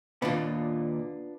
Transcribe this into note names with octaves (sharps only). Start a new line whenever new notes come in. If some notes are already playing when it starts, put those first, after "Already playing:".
D#2 A#2 B3 D4 F4